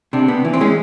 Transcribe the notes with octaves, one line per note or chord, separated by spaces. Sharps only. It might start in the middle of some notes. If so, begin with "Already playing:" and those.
C3 D4
B3
E3
C4
G#3 C#4